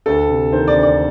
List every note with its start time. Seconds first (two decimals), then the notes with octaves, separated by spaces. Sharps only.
0.06 D2 A4
0.29 C3
0.52 D#3 C5
0.68 D5
0.75 D2
0.83 D5